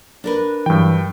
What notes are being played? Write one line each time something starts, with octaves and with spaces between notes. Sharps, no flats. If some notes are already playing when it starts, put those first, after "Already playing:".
D4 A#4 B4
G2 E3 F#3 G5